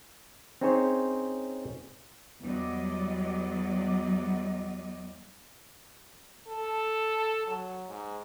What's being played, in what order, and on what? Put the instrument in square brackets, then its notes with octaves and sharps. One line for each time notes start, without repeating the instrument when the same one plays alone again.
[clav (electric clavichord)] C4 C#4 D#4 G#4 C5 C#5
[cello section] E2 F#3 G3 D5 D#5
[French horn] A4
F#3
G#2